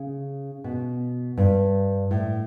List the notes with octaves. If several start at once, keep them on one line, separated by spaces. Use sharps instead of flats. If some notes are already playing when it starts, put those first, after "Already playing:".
Already playing: C#3
B2
G2
A2